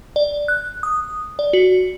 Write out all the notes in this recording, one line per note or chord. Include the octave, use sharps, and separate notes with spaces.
D5
F#6
D#6
D5
F#4